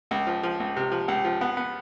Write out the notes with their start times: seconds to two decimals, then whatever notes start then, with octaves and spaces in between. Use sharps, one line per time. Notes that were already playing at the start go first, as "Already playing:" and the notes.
0.11 C#2
0.27 F3
0.43 F3
0.60 C#2
0.76 C3
0.92 F3
1.08 C#2
1.24 F3
1.41 B3
1.57 B3